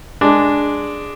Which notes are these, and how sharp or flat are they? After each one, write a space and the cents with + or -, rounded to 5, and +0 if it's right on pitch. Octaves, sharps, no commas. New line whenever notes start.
G#3 +0 D4 +0